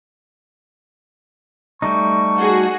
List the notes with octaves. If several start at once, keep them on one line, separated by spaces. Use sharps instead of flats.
G3 A3 D#4 C#6
F#4 G#4